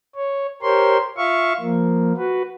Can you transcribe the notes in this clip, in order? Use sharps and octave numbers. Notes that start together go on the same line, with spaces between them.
C#5
G4 A#4 C5 C#5 C6
F4 E5 F5 C#6
F3 A#3
F#4 B4